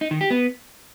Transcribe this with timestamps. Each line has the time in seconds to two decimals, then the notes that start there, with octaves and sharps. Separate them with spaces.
0.01 D#4
0.11 D#3
0.21 G4
0.30 B3